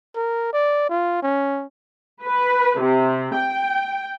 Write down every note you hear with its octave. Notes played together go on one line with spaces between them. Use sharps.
A#4
D5
F4
C#4
B4
C3
G5